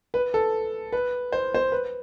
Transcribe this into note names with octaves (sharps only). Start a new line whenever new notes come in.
B4
A4
B4
C5
C5
B4